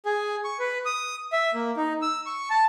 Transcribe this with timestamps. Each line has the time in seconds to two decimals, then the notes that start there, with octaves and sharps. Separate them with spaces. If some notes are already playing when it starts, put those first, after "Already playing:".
0.06 G#4
0.44 C#6
0.59 B4
0.85 D#6
1.32 E5
1.54 A#3
1.77 D#4
2.02 E6
2.26 C#6
2.50 A5